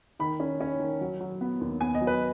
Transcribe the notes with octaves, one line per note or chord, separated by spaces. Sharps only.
D#3 B5
C#4
C#4
D#3
F#3
F#3
B3
D#2
B3 G#5
D#5
F#3
B4